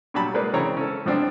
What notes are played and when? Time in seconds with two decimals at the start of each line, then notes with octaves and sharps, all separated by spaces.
0.14 A#2 F#3 G3 F#4 A5 B5
0.34 G#3 A#3 B4 C5 D5
0.53 C#3 E3 C4 C#5 A#5
0.77 C#4 A4
1.06 F2 F3 F#3 B3 C4 D4